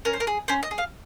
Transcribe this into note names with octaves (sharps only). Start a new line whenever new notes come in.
C#4 A#4
C5
A#4
G#4
C#4 C5
D#5
G#4
F5